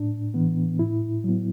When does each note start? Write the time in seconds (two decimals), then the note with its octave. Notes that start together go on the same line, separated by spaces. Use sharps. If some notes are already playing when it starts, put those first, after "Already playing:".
Already playing: A2 D4
0.34 E3 B3
0.79 A2 E4
1.24 F#3 B3